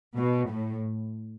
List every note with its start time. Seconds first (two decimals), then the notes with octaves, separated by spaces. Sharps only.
0.16 B2
0.50 A2